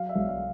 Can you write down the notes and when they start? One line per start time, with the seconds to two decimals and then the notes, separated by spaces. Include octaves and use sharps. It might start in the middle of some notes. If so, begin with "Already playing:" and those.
Already playing: F#3 F5
0.09 E5
0.15 B1
0.28 F5